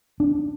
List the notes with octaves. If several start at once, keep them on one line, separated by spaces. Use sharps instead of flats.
D4